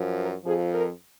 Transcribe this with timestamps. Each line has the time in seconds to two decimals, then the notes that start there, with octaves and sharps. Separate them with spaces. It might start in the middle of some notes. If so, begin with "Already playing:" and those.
Already playing: F#2 F3
0.18 A#4
0.45 F2 F3 G#4
0.75 A#4